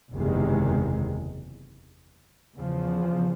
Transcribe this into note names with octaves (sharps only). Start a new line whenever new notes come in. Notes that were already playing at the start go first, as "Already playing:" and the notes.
F#1 E2 C3 D#3 G#3
E2 C#3 F3